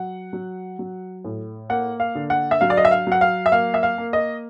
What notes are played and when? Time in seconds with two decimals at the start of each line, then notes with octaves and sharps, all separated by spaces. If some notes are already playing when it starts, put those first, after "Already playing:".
Already playing: F#3 F#5
0.33 F#3
0.79 F#3
1.25 A2
1.69 A#3 F#5
2.00 F5
2.15 D3
2.30 F#5
2.51 E5
2.61 F#3 F5
2.70 D5
2.77 D#5
2.85 E5
2.91 F5
3.07 F#3 F#5
3.21 F5
3.46 E5
3.52 A#3 F5
3.74 E5
3.83 F5
3.98 A#3
4.13 D#5